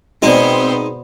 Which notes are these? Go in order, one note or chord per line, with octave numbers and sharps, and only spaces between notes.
B2 G#3 B3 C4 D#4 F#4 C5 D5